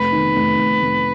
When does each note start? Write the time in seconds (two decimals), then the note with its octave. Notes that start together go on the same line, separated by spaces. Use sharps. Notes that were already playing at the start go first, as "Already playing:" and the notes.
Already playing: F1 B4
0.12 D#3
0.36 F1
0.58 F1
0.82 F1